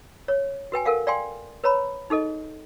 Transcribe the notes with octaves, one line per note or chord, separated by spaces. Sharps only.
C#5
F#4 B4 G5 G#5
A4 A#4 F5 F#5
D5 F5 G5 G#5 C6
B4 C#5 A#5 B5
D#4 G#4 A4 D#5